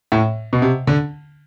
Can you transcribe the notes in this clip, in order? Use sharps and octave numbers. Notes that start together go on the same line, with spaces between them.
A2
B2
C3
D3